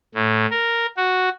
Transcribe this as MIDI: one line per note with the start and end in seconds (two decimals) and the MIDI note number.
0.15 0.46 45
0.51 0.86 70
0.97 1.29 66